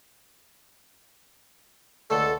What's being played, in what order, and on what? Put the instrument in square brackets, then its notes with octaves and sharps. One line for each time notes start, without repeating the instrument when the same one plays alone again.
[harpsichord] C#2 D3 A3 [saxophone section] A4